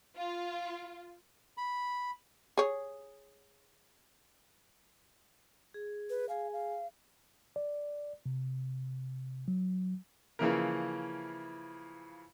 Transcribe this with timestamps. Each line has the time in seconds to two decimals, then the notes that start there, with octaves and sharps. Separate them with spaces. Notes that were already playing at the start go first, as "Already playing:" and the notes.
0.17 F4
1.57 B5
2.57 G#4 C#5
5.74 G#4
6.10 B4
6.29 G#4 F5 G#5
6.53 F5
7.56 D5
8.26 C3
9.48 F#3
10.39 C#3 E3 F3 A#3 E4 A#4